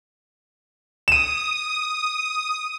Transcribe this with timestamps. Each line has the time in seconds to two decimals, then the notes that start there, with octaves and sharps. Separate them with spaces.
1.08 D#6 D#7 E7